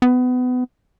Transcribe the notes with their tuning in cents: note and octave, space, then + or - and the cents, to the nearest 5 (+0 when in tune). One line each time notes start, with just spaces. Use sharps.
B3 +25